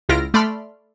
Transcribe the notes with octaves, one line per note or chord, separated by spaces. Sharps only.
C#2 E4 F4 F6 A#6 D7
A3 D5 B5 C6 F6